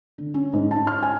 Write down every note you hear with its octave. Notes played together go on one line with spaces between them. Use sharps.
D3
C#4
G#2
A5
F6
G#5